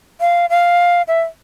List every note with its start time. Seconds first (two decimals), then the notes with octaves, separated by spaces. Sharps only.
0.21 F5
0.50 F5
1.08 E5